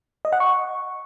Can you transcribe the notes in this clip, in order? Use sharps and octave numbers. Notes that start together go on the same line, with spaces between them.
D#5
F#5
C#6